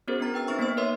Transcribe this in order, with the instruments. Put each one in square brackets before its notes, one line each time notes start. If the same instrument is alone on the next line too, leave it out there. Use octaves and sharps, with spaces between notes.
[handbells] B3 C#4 F#4 G#4 A#4 C5
B3 D4 A#5 A6
B4 G5 E6 A6
C4 D#4 E5 C#6 E6
A#3 B3 D#4 C5 E6
A#4 B4 C#5 E5 C6 E6